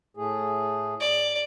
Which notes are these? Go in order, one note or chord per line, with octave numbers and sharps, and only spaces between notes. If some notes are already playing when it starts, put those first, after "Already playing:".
A2 A3 G#4
D5